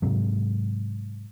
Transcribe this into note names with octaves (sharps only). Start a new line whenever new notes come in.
G#2 C3 F#3